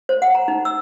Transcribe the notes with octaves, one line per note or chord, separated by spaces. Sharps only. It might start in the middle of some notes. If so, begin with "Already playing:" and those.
C5
F#5
A#5
D#4
E6